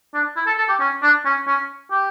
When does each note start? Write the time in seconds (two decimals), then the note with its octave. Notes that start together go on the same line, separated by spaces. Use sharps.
0.14 D4
0.36 E4
0.46 A4
0.58 A4
0.69 G4
0.80 C#4
1.02 D4
1.25 C#4
1.47 C#4
1.91 G4